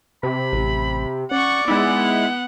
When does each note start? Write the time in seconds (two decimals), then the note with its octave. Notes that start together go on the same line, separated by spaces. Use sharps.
0.23 C3 B5
0.53 A1
1.31 C#4 D5 F#5 C#6
1.68 G#3 B3 D#4 E4 F#5